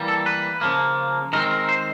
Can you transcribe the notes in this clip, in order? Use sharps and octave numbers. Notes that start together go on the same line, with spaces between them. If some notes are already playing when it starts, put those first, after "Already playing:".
Already playing: E3 G3 A#3
A4
B4
C#3 F3 A#3
D#3 G#3 C4 A#4
A#4
C5